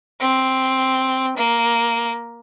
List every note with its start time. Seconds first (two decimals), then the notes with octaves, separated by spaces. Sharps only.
0.21 C4
1.37 A#3